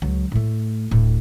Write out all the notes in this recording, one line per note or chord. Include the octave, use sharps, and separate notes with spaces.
C#2 F#3
A2 A3
D1 A2